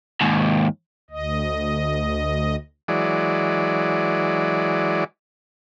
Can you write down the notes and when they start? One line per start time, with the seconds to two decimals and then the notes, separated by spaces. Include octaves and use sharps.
0.21 D#2 G#2
1.11 D2 D#5
2.88 E3 F#3 G#3 D5